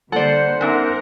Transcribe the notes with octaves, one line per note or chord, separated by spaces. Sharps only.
D3 G3 A#3 A4 C5 D5 F#5
B3 C#4 D#4 A#4